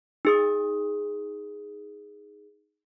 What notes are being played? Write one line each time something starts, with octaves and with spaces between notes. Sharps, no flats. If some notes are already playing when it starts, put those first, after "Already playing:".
D#4 G#4 D#6